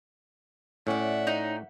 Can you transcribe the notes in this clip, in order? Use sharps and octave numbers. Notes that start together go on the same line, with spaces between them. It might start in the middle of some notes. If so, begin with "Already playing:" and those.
A2 C#4 D5 E5 F#5 G5
D#4